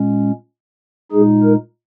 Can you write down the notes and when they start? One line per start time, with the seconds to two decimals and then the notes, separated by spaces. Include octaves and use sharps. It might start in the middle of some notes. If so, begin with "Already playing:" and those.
Already playing: A#2 G#3 C#4
1.12 A#2 G#3 D#4 G#4
1.43 A#4